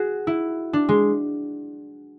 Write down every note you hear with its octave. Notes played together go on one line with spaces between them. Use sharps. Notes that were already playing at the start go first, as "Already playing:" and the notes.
Already playing: F#4 G#4
E4
D4
G#3